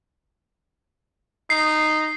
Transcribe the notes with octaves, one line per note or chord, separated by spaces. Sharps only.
D#4 C7